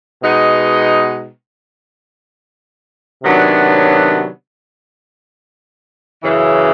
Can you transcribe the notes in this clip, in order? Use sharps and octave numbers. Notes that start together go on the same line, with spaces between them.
B2 G#3 B3 D#4
C3 D#3 F#3 B3 D4
F#2 C#3 E3